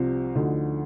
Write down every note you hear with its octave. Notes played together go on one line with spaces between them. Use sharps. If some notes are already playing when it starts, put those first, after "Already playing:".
Already playing: C2 C3 F3 C4 F4
D2 D3 F3 A3 D#4